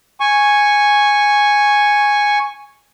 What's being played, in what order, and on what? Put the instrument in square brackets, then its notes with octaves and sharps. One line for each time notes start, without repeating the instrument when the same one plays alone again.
[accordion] G#5 C#6